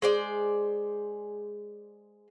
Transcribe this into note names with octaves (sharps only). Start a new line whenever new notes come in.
G#3 C5 D5